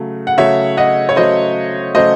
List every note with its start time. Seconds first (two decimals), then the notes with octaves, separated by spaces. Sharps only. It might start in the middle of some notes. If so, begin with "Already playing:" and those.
Already playing: C#3 F#3 A3
0.27 F#5
0.38 C#3 F#3 A3 C#5 E5
0.77 D#5 F#5
1.09 C#5
1.16 C#3 F#3 A3 C5 D#5
1.94 C#3 F#3 A3 C5 D#5